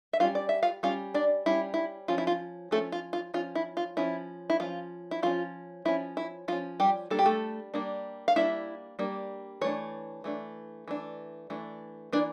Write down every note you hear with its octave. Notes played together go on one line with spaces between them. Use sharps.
E5
G3 C#4 F4 F5
D5
E5
F4 F5
G3 C#4 F4 F5
D4 D5
G3 C#4 E4
E4
F3 C#4 F4
E4
F4
F3 A3 C#4 A4
F4
F4
F3 C#4 F4
E4
F4
F3 C#4 E4
E4
F3 C#4 F4
E4
F3 C#4 F4
F3 C#4 E4
E4
F3 C#4 F4
G3 G4
G3 A#3 D4 A4
G4
A3 A4
G3 A#3 D4
F5
G3 A#3 D4 E4 E5
G3 A#3 D4
E3 A3 D4 C#5
E3 A3 D4
E3 A3 D4
E3 A3 D4
E3 A#3 D4 D5